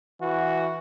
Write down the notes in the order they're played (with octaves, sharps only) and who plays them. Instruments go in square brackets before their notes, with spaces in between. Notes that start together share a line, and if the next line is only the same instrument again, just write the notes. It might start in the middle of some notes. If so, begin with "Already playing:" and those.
[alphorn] E3 [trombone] F#4